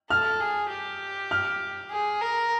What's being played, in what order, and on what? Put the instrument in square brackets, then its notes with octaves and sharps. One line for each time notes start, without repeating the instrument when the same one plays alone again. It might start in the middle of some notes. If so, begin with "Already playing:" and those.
[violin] A4 [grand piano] F6
[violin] G#4
G4
[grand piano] F6
[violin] G#4
A#4